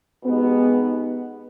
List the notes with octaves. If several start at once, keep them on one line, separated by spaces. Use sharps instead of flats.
B2 G#3 B3 D#4 G4